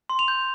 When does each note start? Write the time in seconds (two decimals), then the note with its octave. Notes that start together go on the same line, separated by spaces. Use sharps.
0.10 C6
0.19 F7
0.28 G6